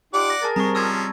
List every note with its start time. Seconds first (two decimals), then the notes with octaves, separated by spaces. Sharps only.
0.14 D#4 F4 G4 D5 F#5 D6
0.30 A#6
0.42 G#4 A#4 A5 A6
0.56 G3 G#3 C4 A#5 C#6
0.75 F3 G#3 C#4 E6 G#6